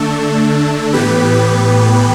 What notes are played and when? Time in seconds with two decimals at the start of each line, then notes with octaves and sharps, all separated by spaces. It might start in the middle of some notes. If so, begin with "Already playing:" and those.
Already playing: D3 A3 D4 A4
0.93 A2 E3 B3 G4 B4